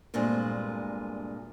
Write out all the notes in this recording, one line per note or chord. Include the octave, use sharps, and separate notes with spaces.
G2 A#2 G#3 A3 C4 D4